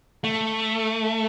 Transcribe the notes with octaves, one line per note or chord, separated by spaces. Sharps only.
A3